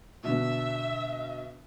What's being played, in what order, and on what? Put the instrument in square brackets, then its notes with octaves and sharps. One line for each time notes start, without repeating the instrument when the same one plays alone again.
[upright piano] B2 D3 [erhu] E5